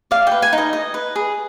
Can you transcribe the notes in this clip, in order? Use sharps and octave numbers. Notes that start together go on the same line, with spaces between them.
D5 F5
B4 G5
G#5
D#4
D#5
D#5
B4
G#4